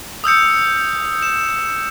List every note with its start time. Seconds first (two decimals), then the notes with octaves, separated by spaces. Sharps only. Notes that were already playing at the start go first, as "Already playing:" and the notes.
0.24 D#6 E6 G6 C#7
1.22 E7